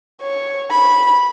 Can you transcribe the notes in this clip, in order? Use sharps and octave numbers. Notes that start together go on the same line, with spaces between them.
C#5
B5